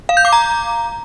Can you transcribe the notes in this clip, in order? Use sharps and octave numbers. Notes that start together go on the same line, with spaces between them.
F5
G6
D6
A#5